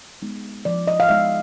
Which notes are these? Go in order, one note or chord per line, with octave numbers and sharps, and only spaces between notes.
G#3 B3 D#4
F3 D5
D#5
F5
G#3 B3 D#4 E5